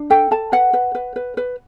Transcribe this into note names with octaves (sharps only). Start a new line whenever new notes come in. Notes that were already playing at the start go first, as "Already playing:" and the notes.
Already playing: D4
A4 G5
A4 A5
B4 F#5
B4
B4
B4
B4